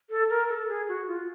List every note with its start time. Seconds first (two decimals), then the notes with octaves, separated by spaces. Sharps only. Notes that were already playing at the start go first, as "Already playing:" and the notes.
0.10 A4
0.30 A#4
0.49 A4
0.68 G#4
0.89 F#4
1.07 F4